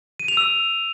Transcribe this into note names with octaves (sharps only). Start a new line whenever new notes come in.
D#7
F7
E6